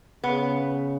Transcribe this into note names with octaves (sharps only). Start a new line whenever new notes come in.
C#3 B3